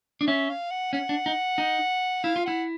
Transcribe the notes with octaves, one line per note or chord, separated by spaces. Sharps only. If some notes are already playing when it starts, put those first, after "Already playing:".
D4
C#4 E5
F5
F#5
C#4 F#5
D4
D#4
D#4
E4 F5
F4
E4 F#5